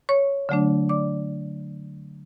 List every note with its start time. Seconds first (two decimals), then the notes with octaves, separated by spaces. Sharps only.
0.09 C#5 C#6
0.49 D3 F#3 A3 D4
0.89 D5 D6